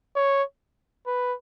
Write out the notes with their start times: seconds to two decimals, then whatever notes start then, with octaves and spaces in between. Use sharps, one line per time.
0.16 C#5
1.07 B4